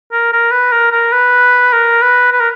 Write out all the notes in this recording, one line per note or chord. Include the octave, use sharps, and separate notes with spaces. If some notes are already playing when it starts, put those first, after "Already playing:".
A#4
A#4
B4
A#4
A#4
B4
A#4
B4
B4
A#4